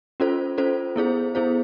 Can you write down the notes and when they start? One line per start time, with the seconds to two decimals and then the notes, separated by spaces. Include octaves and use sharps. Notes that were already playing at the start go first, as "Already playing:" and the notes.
0.20 C#4 F4 A4 C5
0.58 C#4 F4 A4 C5
0.96 B3 E4 G#4 C5
1.35 B3 E4 G#4 C5